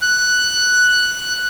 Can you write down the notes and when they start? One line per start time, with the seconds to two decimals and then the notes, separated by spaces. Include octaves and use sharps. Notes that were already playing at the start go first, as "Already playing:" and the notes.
0.02 F#6